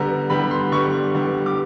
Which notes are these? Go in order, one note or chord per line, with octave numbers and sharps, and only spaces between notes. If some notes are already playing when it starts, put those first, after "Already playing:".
Already playing: D3 G3 B3 A#5
D3 G3 B3 B5
C6
D3 G3 B3 C#6
D3 G3 B3
D6